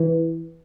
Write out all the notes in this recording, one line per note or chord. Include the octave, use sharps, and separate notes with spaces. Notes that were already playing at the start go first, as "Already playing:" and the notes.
Already playing: E3